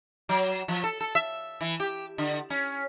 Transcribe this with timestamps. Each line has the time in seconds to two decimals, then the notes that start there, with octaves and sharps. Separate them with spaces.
0.29 F#3
0.68 F3
0.84 A4
1.00 A4
1.15 E5
1.61 E3
1.80 G4
2.18 D3
2.50 C#4